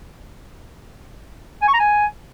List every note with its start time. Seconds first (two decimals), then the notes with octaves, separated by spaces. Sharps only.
1.62 G#5
1.68 C#6
1.74 A#5
1.80 G#5